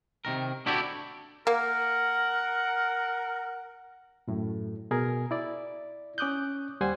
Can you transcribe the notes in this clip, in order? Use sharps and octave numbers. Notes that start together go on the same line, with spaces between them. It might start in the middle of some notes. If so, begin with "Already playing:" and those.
C3 D#3 A#4
D4 E4 F#4 G4 A4 D5
A#3 A#4 F#5
F#2 A2
B2 G#4 A#4
E4 D5
C#4 D6 D#6 F#6 G6
D#2 G3 C5 F#5 G#5